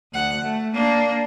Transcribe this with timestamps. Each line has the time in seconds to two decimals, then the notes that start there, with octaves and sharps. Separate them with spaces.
0.13 D2 F#5
0.42 A3
0.74 A#3 D4